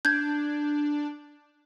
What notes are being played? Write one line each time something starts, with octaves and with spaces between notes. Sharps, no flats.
D4 G6 G#6